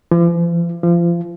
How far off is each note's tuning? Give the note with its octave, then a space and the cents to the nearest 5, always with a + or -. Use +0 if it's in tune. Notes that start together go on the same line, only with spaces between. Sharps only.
F3 -45
F3 -30